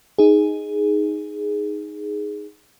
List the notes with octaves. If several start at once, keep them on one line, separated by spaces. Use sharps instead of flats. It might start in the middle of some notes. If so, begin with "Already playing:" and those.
D#4 G#4